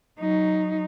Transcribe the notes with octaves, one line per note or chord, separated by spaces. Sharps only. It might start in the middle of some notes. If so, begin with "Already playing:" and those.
F#3 D#4